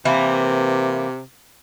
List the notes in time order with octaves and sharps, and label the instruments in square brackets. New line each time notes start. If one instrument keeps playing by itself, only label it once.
[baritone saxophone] C3 [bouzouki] E3 A#3